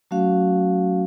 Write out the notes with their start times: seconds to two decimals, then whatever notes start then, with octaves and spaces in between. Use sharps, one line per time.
0.11 F#3 A3 C#4 F#4 F5